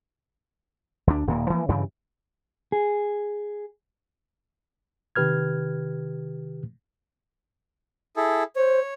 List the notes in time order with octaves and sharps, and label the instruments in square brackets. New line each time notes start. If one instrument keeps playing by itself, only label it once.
[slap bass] D2 D4
D#1 A#2 D#3 A#3
E3 F3 A#3
G2 C#3 E3 G3
[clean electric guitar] G#4
[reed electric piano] C3 D#3 G4 B4 F6 G#6
[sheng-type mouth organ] E4 G#4 A4
[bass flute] C5 [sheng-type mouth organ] C#5